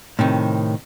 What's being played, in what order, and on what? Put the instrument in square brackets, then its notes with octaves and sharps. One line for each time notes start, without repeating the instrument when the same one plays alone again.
[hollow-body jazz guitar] A2 C3 D#3